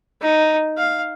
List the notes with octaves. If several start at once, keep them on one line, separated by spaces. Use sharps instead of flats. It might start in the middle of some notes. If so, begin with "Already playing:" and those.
D#4
F5